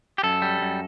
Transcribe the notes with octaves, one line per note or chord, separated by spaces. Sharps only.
G4
F#2 A4
G3
F#2